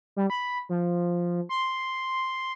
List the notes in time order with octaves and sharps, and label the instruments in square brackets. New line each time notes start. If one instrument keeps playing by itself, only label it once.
[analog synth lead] G3
B5
F3
C6